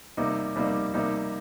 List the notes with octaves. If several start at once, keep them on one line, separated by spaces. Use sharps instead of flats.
C3 G3 A#3 D#4
C3 G3 A#3 D#4
C3 G3 A#3 D#4